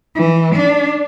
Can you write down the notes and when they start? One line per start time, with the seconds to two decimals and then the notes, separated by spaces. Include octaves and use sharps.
0.15 E3
0.55 D4